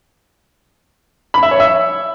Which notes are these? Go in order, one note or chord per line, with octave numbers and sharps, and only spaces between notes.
B5
E5
C#5
E5